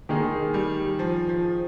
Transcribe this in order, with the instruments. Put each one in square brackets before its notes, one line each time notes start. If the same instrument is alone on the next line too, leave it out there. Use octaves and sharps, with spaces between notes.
[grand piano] D#3 A#3 D#4 G#4 [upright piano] G#3
[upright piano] G3
F3
F3